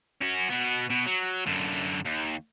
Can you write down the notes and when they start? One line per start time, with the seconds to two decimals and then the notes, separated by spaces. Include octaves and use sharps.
0.21 C#4 F#4
0.50 B2 B3
0.90 B2
1.06 F#3
1.46 F#2 D3
2.05 D#2